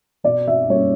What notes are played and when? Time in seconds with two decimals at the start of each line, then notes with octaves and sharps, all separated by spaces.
0.24 B2 D5
0.47 E5
0.69 G3 A#3 C#4 C#5